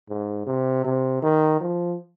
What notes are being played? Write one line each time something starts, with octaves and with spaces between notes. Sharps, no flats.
G#2
C3
C3
D#3
F3